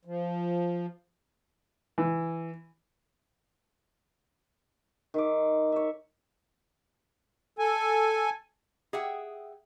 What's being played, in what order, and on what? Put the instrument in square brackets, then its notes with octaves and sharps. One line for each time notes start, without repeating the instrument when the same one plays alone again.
[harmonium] F3
[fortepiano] E3
[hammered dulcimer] D#3 E5 D6
C#5 E5
[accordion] A4 G#5
[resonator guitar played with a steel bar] G#4 E5 F#5 G5